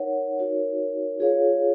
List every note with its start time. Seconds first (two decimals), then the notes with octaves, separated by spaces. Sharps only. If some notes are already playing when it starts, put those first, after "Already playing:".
Already playing: D#4 A#4 C#5 F#5
0.39 D#4 F#4 A#4 C#5
1.19 F4 G#4 C#5 F5